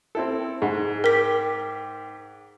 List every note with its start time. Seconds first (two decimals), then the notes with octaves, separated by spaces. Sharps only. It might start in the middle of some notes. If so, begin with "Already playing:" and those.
0.15 C4 E4 A4
0.62 G#2 G#4
1.04 A#4 G5 D6 B6